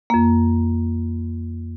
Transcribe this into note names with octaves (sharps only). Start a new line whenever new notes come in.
F2 A#3